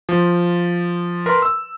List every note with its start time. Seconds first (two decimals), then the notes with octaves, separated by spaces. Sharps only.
0.09 F3
1.26 A#4 B4 C6
1.42 E6